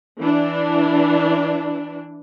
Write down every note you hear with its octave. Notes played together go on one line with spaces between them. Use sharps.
E3 D4